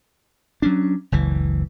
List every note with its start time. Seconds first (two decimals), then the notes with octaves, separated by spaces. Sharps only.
0.62 F#3 C#4 D4
1.12 F#1 C#2 E3